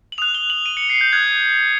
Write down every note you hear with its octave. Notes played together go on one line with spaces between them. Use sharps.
F#7
D#6 F#6 F7
G7
F#7
D#7
C#7
C7
G6
D#6 F#6 G#6